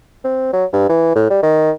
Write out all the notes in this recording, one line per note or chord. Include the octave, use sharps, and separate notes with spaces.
C4
F#3
G2
E3
A2
G3
D#3